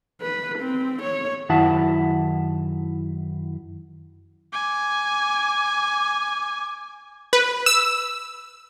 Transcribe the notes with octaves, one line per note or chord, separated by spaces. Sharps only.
B4
C4
C#5
F#2 D#3 E4 F#5 A5
G#5 D6
B4
E6